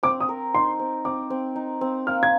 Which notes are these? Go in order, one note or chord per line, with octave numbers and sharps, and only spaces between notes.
C4 D6
D#6
A#4
D#4 C6
C4
C4 D6
C4
D#4
C4
A#3 F6
G#6